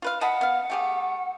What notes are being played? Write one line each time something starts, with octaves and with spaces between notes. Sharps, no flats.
F4 B4 F5
D#5 F#5 A5 B5
B3 F5
A3 G4 G#4